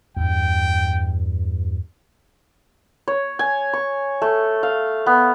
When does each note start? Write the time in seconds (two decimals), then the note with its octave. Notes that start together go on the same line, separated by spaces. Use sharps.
0.16 E2 G2 G5
3.08 C#5
3.39 G#5
3.73 C#6
4.22 A3
4.63 F5
5.06 B3